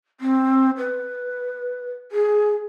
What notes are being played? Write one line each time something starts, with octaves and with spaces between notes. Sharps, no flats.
C4
B4
G#4